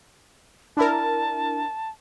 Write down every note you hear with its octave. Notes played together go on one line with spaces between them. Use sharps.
D4 E4 A#4 A5